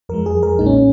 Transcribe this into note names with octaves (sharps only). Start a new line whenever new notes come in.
F2 F3 G#3 A#4
G#4
A#4
B1 A#2 G#3 D#4
C#4